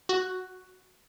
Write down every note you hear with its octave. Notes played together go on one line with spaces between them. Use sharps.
F#4